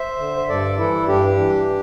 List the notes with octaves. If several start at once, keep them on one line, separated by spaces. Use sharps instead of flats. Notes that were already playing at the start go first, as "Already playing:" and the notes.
Already playing: C5 E5
D3
C5
G2 A4 D5
E3 E4 A4
G2 D4 G4
E3